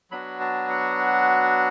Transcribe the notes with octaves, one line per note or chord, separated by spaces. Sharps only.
F#3 B3 D4 F#4 B5
A5
F#5